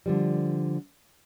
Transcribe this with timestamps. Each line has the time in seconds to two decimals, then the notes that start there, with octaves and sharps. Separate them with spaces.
0.06 D3 F3 G3